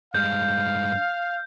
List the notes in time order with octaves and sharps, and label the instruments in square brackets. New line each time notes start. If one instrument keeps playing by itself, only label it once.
[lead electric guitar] G2 G#3 [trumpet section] F5 [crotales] G6